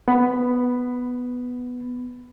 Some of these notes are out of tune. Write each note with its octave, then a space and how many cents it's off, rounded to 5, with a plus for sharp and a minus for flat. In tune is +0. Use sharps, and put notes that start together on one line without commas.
B3 +0 B5 +15